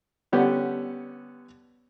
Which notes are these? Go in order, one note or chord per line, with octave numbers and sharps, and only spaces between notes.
D3 G3 B3 C#4 G4